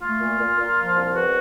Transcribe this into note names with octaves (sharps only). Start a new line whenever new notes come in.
A3 F4
A#2
A#2
A#2
F3
C2
E2 F#4